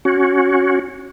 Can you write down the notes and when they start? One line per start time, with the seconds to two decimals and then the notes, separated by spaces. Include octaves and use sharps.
0.05 C#4 F#4